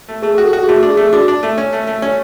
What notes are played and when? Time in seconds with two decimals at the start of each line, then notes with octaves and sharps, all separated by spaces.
0.08 A3
0.22 A3 G#4
0.35 F#4 G#4
0.45 A4
0.53 F#4
0.64 G#4
0.68 A3 F#4
0.83 D4
0.90 G#4
0.97 A3
1.07 G#4
1.13 D4 F#4
1.28 D4
1.43 A3
1.58 C#4
1.73 A3
1.87 A3
2.02 C#4